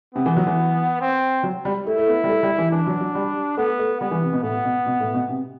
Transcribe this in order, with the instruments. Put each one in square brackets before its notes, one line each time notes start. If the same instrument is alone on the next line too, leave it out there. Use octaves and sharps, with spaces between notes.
[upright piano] C3 [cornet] B3
[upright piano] E3
F#3
E3
[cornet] C4
[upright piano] F#3
G3
[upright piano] A3 [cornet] E4
[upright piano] A3
B3
G3
A3
G3
E3
[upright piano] E3 [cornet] D4
[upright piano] F#3
F#3
G3
[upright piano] A3 [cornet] B3
[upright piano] A3
[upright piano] G3 [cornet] B3
[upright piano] E3
C3
B2
[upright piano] A2 [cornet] B3
[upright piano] B2
B2
A2
B2
C3